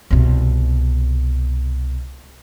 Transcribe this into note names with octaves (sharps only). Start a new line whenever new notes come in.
C2 B2